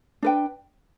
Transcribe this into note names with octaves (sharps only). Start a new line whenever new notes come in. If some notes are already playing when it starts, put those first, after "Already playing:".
D4 B4 G5